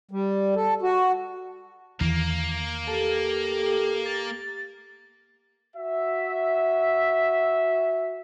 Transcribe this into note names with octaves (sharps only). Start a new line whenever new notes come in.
G3
A4
F#4
E2 D#3 E3 A#3
G4 A4
A6
F#4 E5